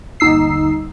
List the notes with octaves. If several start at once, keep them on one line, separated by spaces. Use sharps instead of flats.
G1 D#2 D#4 E6 C7